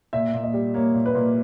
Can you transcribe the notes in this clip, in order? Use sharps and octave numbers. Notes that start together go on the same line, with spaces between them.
A#2 E5
A#2
D#5
G3
A#3 C#5
A#2
B4
A#2